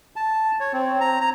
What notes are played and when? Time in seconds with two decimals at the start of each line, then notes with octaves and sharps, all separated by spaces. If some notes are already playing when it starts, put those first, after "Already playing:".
0.16 A5
0.60 C#5
0.73 C4
1.00 A#5
1.21 A#5